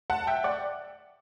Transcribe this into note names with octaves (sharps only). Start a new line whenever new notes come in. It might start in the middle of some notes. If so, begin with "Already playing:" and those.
F#5 A5
E5 G5
D5 F#5